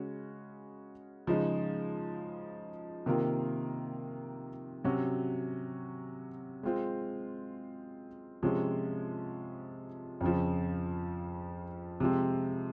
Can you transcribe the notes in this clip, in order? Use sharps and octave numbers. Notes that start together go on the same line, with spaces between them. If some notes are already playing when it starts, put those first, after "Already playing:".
Already playing: C#3 G#3 C#4 F#4
C#3 F3 G#3 D#4
C3 D#3 A#3 F4 A#4
C3 F#3 C#4 F#4
G#3 C4 F4 C5
C3 F3 G#3 C#4
F2 C#3 F3
C3 F3 G#3 C4